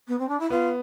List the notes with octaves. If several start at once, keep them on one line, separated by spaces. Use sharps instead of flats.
B3
C4
D4
E4
B3 F4